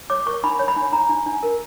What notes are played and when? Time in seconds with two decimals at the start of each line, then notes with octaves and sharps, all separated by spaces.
0.10 C#5 D6
0.26 A#4 C#6
0.44 D4 B5
0.59 C#5
0.68 B5
0.76 D4
0.92 D4 A#5
1.09 D4
1.26 D4
1.43 A#4